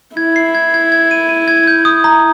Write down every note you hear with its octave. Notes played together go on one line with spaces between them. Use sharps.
E4 G#6
C7
G#6
G#6
G#6
D#7
D#7
G#6
G6
D#6
A#5